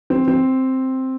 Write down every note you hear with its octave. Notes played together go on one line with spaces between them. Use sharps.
C4
C4